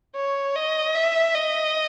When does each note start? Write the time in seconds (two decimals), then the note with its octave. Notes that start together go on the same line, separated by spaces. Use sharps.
0.16 C#5
0.56 D#5
0.95 E5
1.35 D#5